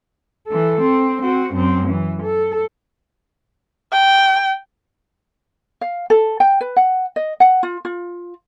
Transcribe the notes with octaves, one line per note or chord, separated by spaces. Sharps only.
E3 A4
C4
C4 F#4
F#2 C4
E3
A4
G5
F5
A4
G5
B4
F#5
D#5
F#5
F4
F4